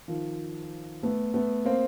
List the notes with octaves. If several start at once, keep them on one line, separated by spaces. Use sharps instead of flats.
D#3 F3
A3 B3
A3 B3
A#3 C4